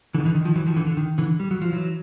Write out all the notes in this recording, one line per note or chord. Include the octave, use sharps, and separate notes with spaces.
D3 E3
D#3
D3 E3
D#3
D#3 F3
E3 F#3
D#3 F3
D3 E3
D3
D#3
D3 E3
G3
F#3
F3
E3 F#3